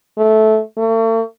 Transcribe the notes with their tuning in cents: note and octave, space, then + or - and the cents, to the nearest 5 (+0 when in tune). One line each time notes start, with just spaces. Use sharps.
A3 -15
A3 +45